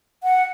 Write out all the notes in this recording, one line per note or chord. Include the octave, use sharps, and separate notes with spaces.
F#5